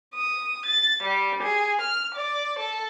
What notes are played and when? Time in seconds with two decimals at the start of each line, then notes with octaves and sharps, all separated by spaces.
0.13 D#6
0.66 A6
1.03 G3
1.44 G#4
1.81 F6
2.14 D5
2.57 A4